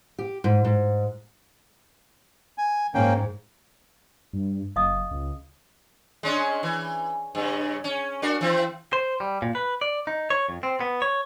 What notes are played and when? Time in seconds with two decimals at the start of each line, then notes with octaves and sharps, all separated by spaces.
0.19 G4
0.44 G#2
0.65 G#2
2.58 G#5
2.94 G#2 A#3 C#4 G5
4.33 G2
4.76 F#1 D#5 F5 D#6
5.11 C#2
6.23 G#3 C#4 D4
6.63 E3
7.35 G2 C#3
7.84 C#4
8.22 D4 F#4 A#4
8.41 E3 C4
8.93 C5
9.20 G3
9.42 A#2
9.55 B4
9.81 D5
10.07 D#4
10.30 C#5
10.49 F2
10.63 C4
10.81 B3
11.02 C#5